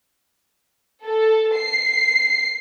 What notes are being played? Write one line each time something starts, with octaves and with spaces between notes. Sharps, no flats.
A4
C7